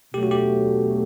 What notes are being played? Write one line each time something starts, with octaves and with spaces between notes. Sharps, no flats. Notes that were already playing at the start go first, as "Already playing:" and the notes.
B2 F#3 A3 D4 G4
F#4
G4